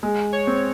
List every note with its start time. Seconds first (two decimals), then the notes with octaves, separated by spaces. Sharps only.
0.03 G#3
0.33 C#5
0.47 C4